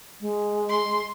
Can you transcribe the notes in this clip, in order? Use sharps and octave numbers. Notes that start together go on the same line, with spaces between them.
G#3
C6